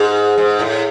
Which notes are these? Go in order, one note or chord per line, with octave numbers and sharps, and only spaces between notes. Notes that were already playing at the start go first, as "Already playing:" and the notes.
Already playing: G#2
G#2
A2